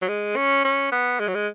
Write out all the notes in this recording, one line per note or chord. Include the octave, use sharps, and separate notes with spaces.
F#3
G#3
C#4
C#4
B3
G#3
F#3
G#3